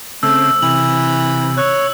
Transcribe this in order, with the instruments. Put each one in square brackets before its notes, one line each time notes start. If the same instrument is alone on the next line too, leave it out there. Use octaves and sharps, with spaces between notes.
[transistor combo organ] C#3 C4 [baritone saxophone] A3 [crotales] E6
[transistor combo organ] C3 [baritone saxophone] E3 [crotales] E6 F#7
[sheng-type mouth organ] C#5 [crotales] E6 F#6